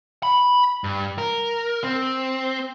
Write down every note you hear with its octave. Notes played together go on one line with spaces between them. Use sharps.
B5
G2
A#4
C4